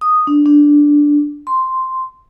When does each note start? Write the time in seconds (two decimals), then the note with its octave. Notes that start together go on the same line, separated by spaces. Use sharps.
0.01 D#6
0.27 D4
0.46 D4
1.47 C6